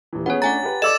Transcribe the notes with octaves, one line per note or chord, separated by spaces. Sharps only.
D#1 E3
B3 C#4 G#4 C#5 F#5
A3 C#4 D4 F#5 G#5 A#5 A6
G4 B4
A4 D5 D#5 D6 E6 E7